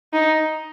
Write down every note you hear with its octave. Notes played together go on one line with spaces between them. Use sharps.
D#4